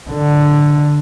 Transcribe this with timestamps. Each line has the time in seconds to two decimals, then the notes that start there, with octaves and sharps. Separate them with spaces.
0.10 D3